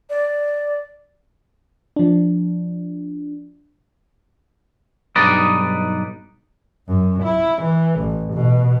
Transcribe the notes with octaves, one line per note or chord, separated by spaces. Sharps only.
D5
F3 D4
B1 G2 D#4 B4 D5 D#5
F#2
E4
E3
A1
B2